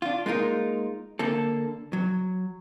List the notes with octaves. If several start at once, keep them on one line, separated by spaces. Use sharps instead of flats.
D4 F4
G#3 A#3 D#4 F4 A#4
D3 A#3 A4
F#3